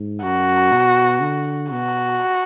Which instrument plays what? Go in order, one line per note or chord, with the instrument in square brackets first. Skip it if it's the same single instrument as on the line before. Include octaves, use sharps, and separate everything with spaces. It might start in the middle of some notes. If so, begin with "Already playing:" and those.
Already playing: [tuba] G#2
[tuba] F#2 [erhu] F#4
[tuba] B2
D3
[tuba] B2 [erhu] F#4